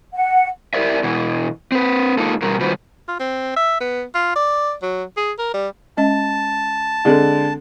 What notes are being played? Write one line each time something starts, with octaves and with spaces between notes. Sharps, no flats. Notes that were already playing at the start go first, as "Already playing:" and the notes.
F#5
E4 G4 A4 A#4 D5 E5
B2 E3
C4 B4
G#3 A#3 D#4 F4 A4
E2 B2 G3 A#4
D#3 G3 F4 F#4 B4 C5
F4
C4
E5
B3
F4
D5
F#3
G#4
A#4
G3
G#3 C#4 D#5 A5
D3 G#3 C4 A4